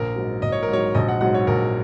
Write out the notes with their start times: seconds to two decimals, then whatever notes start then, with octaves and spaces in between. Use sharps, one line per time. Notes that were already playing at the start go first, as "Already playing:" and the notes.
Already playing: A#1 A#4
0.16 G#2 F#3
0.42 A#1 D#5
0.52 C#5
0.63 A#4
0.68 G#2 F#3 C#5
0.95 A#1 D#5
1.08 F#5
1.21 G#2 F#3 F#5
1.34 C#5
1.47 A#1 A#4